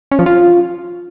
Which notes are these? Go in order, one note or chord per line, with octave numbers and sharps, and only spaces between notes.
C#4
F3
F4